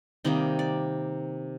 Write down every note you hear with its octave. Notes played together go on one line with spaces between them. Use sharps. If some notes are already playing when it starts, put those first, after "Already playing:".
C3 D#3 G3 A#3 D#5
D5